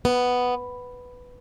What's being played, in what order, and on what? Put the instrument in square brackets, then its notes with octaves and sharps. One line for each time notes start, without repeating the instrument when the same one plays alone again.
[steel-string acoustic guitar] B3